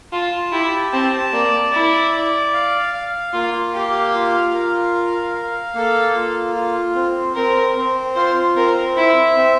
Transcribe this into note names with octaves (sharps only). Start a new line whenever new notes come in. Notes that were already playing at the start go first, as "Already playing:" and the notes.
F4 A5
E4 G4
C4 A5
A#3 D5
E4 D5
D5
F5
F5
A#3 F4
G4 F5
F4
A#4
F5
F5
A#3 A4
F4
F4
C4
C4 A#4
C4
F4 C5
C4 A#4
E4 E5
C4